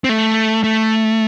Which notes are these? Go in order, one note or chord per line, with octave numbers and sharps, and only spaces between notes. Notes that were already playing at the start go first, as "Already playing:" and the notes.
C4
A3
A3